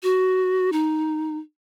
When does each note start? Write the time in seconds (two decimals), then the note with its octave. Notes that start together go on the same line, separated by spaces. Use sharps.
0.03 F#4
0.72 D#4